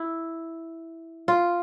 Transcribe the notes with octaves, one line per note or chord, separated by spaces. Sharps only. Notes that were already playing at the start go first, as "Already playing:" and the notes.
Already playing: E4
F4